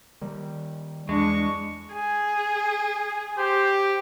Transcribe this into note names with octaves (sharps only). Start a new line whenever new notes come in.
D#3 G3
E2 G#3 D4 C#6
G#4
G4 C5